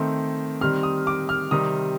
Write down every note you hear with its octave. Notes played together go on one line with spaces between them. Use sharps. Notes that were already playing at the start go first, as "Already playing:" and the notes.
Already playing: D#3 A3 C4
D#3 G3 C4 F6
D#6
D6
F6
C3 D#3 G3 C4 D#6